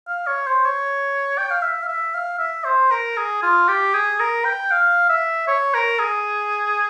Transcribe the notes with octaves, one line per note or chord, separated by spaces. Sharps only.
F5
C#5
C5
C#5
G5
F5
E5
F5
E5
F5
E5
C5
A#4
G#4
F4
G4
G#4
A#4
G5
F5
E5
C#5
A#4
G#4